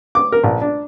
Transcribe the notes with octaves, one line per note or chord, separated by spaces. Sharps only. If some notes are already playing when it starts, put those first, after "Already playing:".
D6
A#4
A#1
D4